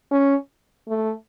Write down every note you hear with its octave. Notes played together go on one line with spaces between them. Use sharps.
C#4
A3